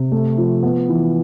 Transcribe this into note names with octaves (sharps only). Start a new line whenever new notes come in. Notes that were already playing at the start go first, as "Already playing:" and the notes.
Already playing: C3
A3
F3
B3
E3